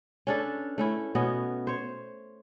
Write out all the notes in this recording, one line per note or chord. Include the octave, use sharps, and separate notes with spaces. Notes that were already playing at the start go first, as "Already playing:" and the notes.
C#4 D4 A4 B4
A3 C#4 E4
B2 B3 C#4 D#5
C5 C#5